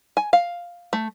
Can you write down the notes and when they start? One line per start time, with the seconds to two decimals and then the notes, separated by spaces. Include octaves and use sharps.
0.17 G#5
0.33 F5
0.93 A3